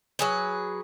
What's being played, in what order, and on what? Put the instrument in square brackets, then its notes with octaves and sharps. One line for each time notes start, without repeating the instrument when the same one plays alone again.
[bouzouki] F#3 G#4 B4